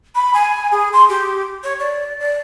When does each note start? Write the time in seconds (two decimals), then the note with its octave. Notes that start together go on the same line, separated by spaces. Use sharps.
0.15 B5
0.34 G#5
0.72 G#4
0.93 C6
1.09 G4
1.64 C#5
1.79 D5
2.20 D5